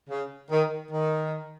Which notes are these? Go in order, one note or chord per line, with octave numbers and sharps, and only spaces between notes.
C#3
D#3
D#3